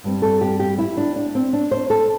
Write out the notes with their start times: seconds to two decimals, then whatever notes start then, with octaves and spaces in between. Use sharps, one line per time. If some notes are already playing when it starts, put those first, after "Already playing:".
0.04 G2 G3 C4
0.22 A4
0.41 G4
0.60 G4
0.78 E4
0.97 D4
1.16 D4
1.35 C4
1.53 D4
1.71 C5
1.90 A4